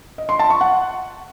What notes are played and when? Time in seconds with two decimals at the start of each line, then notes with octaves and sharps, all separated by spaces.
0.18 D#5
0.29 C6
0.39 A5
0.50 C#6
0.61 F#5